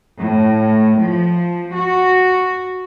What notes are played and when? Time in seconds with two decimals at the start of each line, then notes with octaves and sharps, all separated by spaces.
0.21 A2
0.99 F3
1.74 F#4